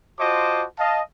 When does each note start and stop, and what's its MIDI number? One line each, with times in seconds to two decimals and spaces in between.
0.20 0.66 65
0.20 0.66 66
0.20 0.66 72
0.20 0.66 75
0.20 0.66 81
0.20 0.66 86
0.79 1.01 75
0.79 1.01 77
0.79 1.01 81